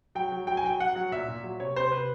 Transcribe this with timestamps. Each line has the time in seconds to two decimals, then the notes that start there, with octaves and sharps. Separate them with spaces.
0.15 F#3 G5
0.32 F#3
0.47 F#3 G5
0.57 G#5
0.64 F#3 G5
0.79 F#3 F#5
0.96 F#3
1.11 A#2 E5
1.28 A#2
1.44 F#3
1.60 C3 C#5
1.76 C3 C5
1.92 C3 B4